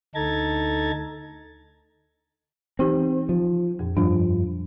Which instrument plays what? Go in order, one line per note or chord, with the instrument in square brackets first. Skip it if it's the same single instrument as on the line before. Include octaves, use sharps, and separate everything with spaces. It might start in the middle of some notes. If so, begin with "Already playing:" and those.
[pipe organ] D2 D#4 A4 A#5 G#6 A6
[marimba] E3 D#4 G4 [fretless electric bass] C4
[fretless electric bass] F3
[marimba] F2 A#2
[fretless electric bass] G2 F3 [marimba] D4